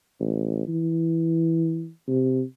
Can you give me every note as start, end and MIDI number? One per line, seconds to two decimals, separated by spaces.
0.20 0.67 33
0.68 1.90 52
2.08 2.43 48